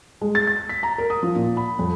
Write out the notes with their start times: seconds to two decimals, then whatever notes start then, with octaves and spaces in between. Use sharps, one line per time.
0.21 G#3
0.35 A6
0.47 A6
0.69 B6
0.83 A#5
0.98 A#4
1.10 D#6
1.23 F3
1.36 A#2
1.57 B5
1.79 F2